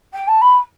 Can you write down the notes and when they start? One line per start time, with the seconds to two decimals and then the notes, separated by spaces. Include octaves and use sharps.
0.13 G5
0.28 A5
0.41 B5